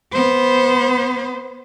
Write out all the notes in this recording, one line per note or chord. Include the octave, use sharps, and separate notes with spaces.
B3 C5